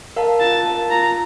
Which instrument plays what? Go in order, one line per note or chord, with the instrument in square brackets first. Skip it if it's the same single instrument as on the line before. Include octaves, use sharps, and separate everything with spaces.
[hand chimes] A#4 F5 A5
[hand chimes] F4 [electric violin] A5
[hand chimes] A#4 F5 A5
[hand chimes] F4 [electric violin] A#5